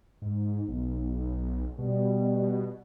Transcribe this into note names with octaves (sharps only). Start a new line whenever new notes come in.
G#2
B1
B2 G3